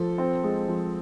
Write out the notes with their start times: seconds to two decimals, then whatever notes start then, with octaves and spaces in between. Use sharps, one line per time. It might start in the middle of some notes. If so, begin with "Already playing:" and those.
Already playing: F3 A4
0.18 C4
0.43 G#3
0.68 F3